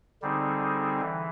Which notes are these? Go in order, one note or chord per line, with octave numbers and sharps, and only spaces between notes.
D3 G3 C4 D#4 G#4
E3